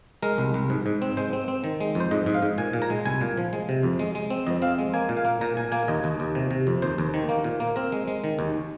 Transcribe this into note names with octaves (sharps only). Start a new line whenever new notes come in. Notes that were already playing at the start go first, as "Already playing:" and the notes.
G#3 A#4
C2
C2
G#2
G#2
C4
G#3 C5
C4
C4
D#3
G#3
F2 C5
G#2 D#5
G#2
F5
G#2
A#2 G#5
A#2
A#5
G#3
C2 G#5
A#2
F3
G#3
C3
F2
G#3
G#3
C4
F2 D#5
C4 F5
G#3
A#3 G#5
A#2
F5
A#3
A#2 A#5
A#2 G#5
A#3 G#5
D#2 D#5
D#2
D#2
C3
C3
F2
D#2 C5
D#2
D#3
A#3
A#2
A#3
C4 A#4
G#3
G#3
D#3
D#2